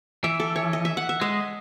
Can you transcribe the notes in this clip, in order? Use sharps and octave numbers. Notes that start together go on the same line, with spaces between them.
E3 E5
A4
C#5
D#5
E5
F#5
E5
G#3 D#5